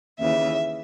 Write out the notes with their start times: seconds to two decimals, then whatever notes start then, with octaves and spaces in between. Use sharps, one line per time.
0.19 D#2 C#3 E3 E5